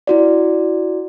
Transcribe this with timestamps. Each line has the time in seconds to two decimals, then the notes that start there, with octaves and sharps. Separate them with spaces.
0.07 E4 F#4 D5